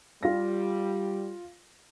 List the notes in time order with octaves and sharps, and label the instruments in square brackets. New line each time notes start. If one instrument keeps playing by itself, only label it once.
[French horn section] G3 [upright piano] F4 F5 A#6